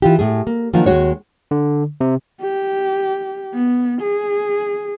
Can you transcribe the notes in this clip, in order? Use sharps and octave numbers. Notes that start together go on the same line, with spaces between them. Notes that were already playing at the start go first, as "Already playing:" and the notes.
E3 F4 G4
A2 A3 G#4
A#3
D#3 F3 F#3 A#3 D4 F4
D#2 G#2 G#3 F#4 C#5
D3
C3
G4
B3
G#4